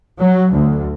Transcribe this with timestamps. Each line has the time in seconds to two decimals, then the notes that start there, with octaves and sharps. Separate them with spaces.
0.21 F#3
0.53 D2